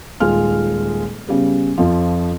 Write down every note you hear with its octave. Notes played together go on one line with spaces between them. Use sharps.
D#1 G#3 F4 F6
C#3 G3 B3
F2 F3